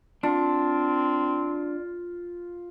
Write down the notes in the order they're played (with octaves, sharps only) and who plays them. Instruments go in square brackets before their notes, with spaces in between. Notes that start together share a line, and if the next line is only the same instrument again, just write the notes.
[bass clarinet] C4 [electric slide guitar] D4 [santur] F4